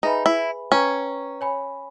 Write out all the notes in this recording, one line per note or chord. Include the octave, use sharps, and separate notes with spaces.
D#4 G#4 B4 E5 G#5 B5
E4
C#4 B4 G5 A#5 C#6
C#5 G#5 B5